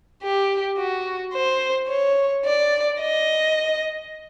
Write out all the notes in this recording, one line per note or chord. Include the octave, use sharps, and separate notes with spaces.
G4
F#4
C5
C#5
D5
D#5